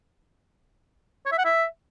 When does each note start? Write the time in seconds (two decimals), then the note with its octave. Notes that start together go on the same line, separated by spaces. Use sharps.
1.26 C#5
1.32 E5
1.38 F#5
1.45 E5